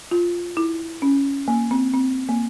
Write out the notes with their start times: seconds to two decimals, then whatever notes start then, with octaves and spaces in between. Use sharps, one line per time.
0.11 F4
0.57 E4
1.02 C#4
1.48 A#3
1.71 C4
1.94 C4
2.29 A#3